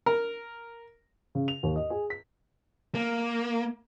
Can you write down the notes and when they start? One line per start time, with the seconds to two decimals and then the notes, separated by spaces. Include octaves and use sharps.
0.06 A#4
1.35 C#3
1.48 F7
1.63 D#2
1.76 D#5
1.90 G#4
2.10 B6
2.95 A#3